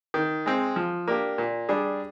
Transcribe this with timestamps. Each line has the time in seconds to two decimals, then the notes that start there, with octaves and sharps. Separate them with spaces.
0.14 D#3
0.46 G#3 C4
0.76 F3
1.08 A#3 D4 G4
1.38 A#2
1.69 G3 D4 G#4